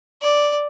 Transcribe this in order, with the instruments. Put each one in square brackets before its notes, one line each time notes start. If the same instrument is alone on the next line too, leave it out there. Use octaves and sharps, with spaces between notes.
[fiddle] D5